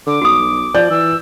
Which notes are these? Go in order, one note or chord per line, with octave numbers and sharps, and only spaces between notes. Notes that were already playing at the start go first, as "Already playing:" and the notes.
D3 D6
B1 F#4 D#6
F3 D5 G6
E3 E6